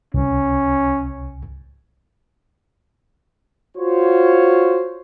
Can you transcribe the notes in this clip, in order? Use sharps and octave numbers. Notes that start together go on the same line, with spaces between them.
C2 C#4
F4 F#4 C5 C#5